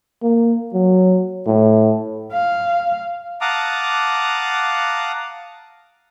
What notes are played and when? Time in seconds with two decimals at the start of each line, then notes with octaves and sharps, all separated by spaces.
0.23 A#3
0.74 F#3
1.47 A2
2.32 F5
3.41 F5 F#5 A5 A#5 D6 D#6